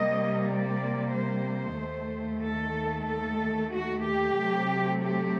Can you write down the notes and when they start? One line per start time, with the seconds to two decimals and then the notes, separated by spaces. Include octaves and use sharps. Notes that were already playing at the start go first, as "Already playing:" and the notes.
Already playing: C3 G3 A#3 D#5
0.49 D5
1.13 C5
1.78 D#2 D#3 A3
2.43 A4
3.07 A4
3.72 F#4
4.04 G4
4.37 C3 F#3 A3 C4
5.01 G4